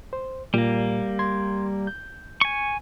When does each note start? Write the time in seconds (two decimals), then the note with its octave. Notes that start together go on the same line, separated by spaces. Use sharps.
0.13 C5
0.54 A#2 G3 A#3
1.19 C6 G#6
1.87 G6
2.41 G#5 C#6